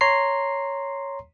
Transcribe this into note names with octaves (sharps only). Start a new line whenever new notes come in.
C#5 A#5 C6 C7